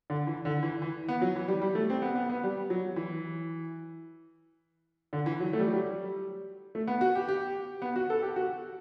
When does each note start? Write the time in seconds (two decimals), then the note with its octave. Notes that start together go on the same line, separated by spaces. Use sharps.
0.10 D3
0.27 E3
0.45 D3
0.63 E3
0.82 E3
1.08 B3
1.22 F#3
1.36 E3
1.48 G3
1.62 G3
1.75 A3
1.90 C4
2.02 B3
2.15 B3
2.30 B3
2.44 G3
2.70 F#3
2.96 E3
5.13 D3
5.26 E3
5.40 F#3
5.53 A3
5.60 G3
5.68 F#3
5.74 G3
6.75 A3
6.87 B3
7.01 F#4
7.15 G4
7.28 G4
7.82 B3
7.96 F#4
8.10 A4
8.22 G4
8.36 F#4